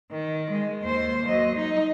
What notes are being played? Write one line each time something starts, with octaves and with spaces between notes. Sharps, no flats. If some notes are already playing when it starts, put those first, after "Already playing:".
D#3
G#3
D#2 C5
F#3 D#5
D#4